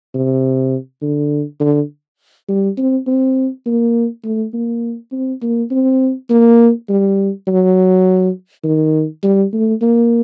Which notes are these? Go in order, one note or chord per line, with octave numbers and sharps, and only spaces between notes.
C3
D3
D3
G3
C4
C4
A#3
A3
A#3
C4
A#3
C4
A#3
G3
F#3
D#3
G3
A3
A#3